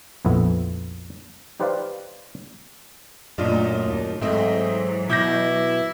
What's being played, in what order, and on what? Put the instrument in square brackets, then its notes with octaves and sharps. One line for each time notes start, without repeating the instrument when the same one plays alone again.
[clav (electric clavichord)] A#1 F2 B3 E4
D#4 G4 B4 C5 D5 F5
[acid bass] F#2 [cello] A#2 A3 [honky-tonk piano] D4 F4 D#5
[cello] D#2
[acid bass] G#2 [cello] E3 F#3 [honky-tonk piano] A3 C4 D#5 [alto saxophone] E5
[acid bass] B2 [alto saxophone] E4 [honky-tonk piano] D6 G6 A#6